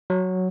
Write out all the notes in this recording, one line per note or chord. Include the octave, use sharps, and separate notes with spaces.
F#3